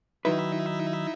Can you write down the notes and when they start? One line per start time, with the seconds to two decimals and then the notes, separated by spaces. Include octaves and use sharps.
0.25 D#3 F#3 D#4 E4 B4 E5